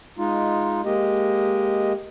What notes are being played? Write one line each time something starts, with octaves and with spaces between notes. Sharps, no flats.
G#3 D#4 F4
G#3 A#3 G4 D#5